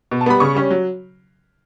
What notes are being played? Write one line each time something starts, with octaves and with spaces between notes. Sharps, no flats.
B2
A5
G3 B3 B5
C#3 C#6
G3 C#4
F#3